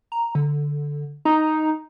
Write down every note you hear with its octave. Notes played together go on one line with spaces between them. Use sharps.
A#5
D3
D#4 A#5